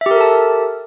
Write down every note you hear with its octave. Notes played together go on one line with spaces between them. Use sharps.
G4 A4 A#4 E5 A5